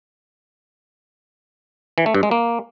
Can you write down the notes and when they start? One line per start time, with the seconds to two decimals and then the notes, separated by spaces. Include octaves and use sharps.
1.98 E3
2.06 A3
2.15 G2
2.23 G#3
2.31 A#3